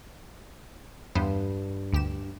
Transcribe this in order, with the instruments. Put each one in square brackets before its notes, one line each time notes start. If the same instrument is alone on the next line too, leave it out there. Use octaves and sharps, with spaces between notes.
[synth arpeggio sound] E2 B3 C5 [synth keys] G2
[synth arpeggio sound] D2 G4 E7